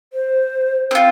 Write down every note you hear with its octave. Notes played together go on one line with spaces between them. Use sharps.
C5
C4 F4